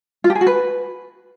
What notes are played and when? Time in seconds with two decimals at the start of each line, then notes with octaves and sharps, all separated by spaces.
0.24 F4
0.30 G4
0.35 G#4
0.41 F#4
0.47 B4